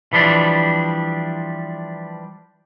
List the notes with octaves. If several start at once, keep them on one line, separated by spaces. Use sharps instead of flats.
E3 F3 G3 D4